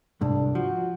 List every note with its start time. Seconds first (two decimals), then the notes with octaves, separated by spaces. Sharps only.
0.21 C2 G#2 D4
0.55 F3 F#4